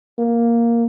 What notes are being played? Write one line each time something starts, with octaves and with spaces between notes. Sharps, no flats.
A#3